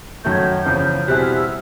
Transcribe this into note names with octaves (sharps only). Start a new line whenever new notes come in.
F#2 D#3 F#3 A3 G6
G#6
G6
E2 C#3 F3
B2 G3 C4 E4 G#4 F#6
F6
E6